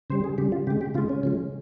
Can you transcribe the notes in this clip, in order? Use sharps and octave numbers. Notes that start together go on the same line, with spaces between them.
C#3 G3 C5
G#4
C#3 G3 G4
F4
C#3 G#3 G4
G4
C#3 G#3 F4
C#4
C#3 F3 G#3